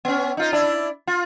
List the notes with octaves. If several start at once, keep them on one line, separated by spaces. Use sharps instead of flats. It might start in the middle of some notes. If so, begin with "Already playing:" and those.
B3 C#4
D#4 F4 D#5
D4 E4 D5
F4